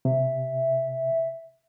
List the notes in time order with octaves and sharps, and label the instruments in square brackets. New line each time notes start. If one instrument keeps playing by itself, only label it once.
[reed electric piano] C3 [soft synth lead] E5